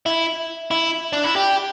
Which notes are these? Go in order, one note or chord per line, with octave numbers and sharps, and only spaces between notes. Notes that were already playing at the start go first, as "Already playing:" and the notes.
E4
E4
D4
E4
G4